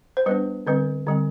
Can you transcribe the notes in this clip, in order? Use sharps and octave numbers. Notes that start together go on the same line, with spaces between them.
C5
G3 B3 D4 B4
D3 G3 C4 B4
D3 G3 C4